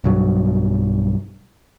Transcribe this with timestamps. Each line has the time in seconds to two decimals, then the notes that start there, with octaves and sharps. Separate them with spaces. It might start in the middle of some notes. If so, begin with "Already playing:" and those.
0.04 B1 G2 F#3